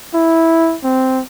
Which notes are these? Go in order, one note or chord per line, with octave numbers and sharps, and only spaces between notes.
E4
C4